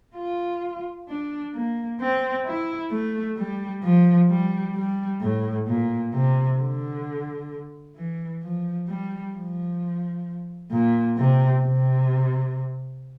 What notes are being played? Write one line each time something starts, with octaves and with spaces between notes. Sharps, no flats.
F4
D4
A#3
C4
E4
A3
G3
F3
G3
G3
A2
A#2
C3
D3
E3
F3
G3
F3
A#2
C3
C3